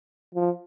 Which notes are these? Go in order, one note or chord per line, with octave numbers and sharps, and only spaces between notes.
F3